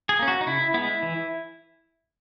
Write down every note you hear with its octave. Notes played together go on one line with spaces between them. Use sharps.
G#4
A#3 C#4
F#4
D#4
C#3 E4
G#3 B3 E4
E3